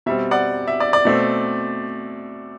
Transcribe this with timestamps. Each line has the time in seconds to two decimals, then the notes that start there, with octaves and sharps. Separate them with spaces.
0.06 B2 G3 C4 E5
0.31 D5 F#5
0.68 E5
0.80 D5
0.93 D5
1.05 B2 A3 C4